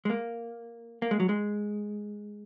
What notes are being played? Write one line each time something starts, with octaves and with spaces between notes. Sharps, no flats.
G#3
A#3
A#3
G#3
F#3
G#3